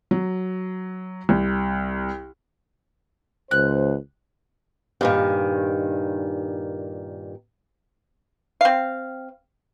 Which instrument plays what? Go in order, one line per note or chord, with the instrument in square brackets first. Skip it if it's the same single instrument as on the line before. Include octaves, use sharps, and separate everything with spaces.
[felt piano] F#3
C2
[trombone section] C#2 C5 [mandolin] F#6
[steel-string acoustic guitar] G2 A#2 D#3
[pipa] C4 F5